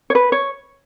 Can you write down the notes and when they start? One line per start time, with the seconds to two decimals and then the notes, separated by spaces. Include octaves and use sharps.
0.10 C#5
0.15 B4
0.32 C#5